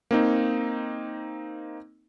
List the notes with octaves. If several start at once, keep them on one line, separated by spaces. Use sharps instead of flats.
A#3 C4 D#4